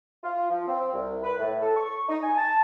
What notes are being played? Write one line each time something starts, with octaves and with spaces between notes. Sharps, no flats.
F4
F3
C4
C2
B4
A2
A4
C#6
D#4
G#5
A5